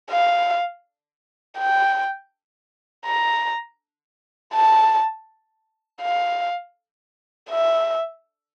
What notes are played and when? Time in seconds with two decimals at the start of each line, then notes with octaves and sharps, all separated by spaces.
0.11 F5
1.58 G5
3.06 A#5
4.54 A5
6.02 F5
7.50 E5